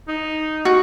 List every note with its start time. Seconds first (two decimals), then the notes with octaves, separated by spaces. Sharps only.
0.08 D#4
0.65 F#4